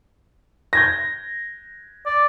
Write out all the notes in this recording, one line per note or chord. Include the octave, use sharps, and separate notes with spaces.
G6 G#6 A#6
D5